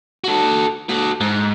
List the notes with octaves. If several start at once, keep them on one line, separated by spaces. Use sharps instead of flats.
F#4 A4
F#4 A4
G#2